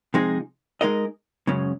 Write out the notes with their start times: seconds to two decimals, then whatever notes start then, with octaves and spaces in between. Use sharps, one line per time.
0.14 C3 F3 G#3 D#4 G#4
0.81 G#3 D#4 A#4 D#5
1.47 F#2 C#3 G#3 C#4